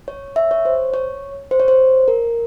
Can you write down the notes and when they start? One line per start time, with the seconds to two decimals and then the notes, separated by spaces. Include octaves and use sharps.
0.08 C#5
0.36 E5
0.51 C#5
0.65 C5
0.94 C#5
1.51 C5
1.60 C#5
1.68 C5
2.08 A#4